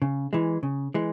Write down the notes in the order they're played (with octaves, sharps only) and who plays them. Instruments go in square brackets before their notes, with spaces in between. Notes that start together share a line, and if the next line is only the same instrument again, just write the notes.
[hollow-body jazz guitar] C#3
E3 G#3
C#3
E3 G#3